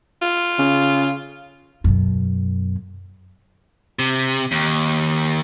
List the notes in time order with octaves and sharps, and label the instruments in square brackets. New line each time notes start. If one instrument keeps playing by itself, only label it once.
[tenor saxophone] F4
[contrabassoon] C#3
[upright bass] F#2 B2
[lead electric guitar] C3
D#2